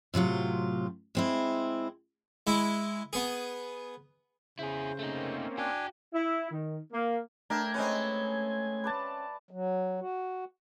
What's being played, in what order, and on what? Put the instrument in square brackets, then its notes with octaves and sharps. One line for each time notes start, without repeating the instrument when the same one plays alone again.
[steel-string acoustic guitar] A2 C3 F#3 F4
G#3 C4 E4
[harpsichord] G#3 E4
B3 G#4
[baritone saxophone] C#3 [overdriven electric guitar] E4 G#4 [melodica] C5
[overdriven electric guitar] A3 D#4 [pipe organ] A#3 C4 C#4
[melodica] D4 G#5 [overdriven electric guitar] F#4 G5
[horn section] E4
D#3
A#3
[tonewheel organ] A3 G#6 [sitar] D4 [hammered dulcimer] A#4 E5 G5
[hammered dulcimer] G#3 B4 [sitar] C4 C#4
[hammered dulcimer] B4 D5 A5
[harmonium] F#3
F#4